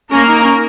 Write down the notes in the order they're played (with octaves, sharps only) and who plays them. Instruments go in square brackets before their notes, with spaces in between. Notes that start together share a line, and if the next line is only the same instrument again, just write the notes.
[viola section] A#3 A#4 [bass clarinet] C#4
[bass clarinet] D#4
C#4